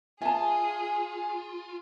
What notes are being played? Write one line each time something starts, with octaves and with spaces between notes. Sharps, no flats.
F4 G#4 E5 G#5 A5